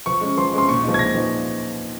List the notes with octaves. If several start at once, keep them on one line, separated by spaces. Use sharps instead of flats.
F3 C#6
G#3 C#4
F3 C6
G#3 C#4 C6
A#2 C#6
F3 G#3 D#4
G#6
A#2 A#6
F3 G#3 D#4